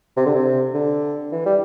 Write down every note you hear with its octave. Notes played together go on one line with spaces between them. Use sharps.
C3
D3
C3
D3
E3
G3